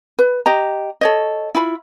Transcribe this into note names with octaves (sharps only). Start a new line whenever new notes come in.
B4
G4 D#5 A#5
A4 C#5 D#5
E4 F4 B5